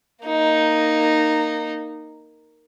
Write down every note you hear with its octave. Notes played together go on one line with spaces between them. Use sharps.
A#3 D#4